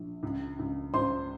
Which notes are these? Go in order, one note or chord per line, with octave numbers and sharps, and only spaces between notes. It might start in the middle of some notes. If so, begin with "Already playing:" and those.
Already playing: A#1
C#2
C#2
C#2 C5 C6